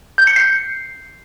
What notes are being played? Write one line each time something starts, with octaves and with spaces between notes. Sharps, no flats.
G6
C#7
C7